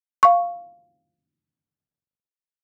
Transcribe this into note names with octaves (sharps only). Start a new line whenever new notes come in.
F5 C#6